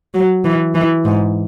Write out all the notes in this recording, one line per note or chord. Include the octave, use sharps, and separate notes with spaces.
F#3
E3
E3
G#2